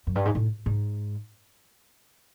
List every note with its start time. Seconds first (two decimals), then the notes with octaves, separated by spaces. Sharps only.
0.07 F#2
0.15 G2
0.25 G#2
0.35 A2
0.66 G#2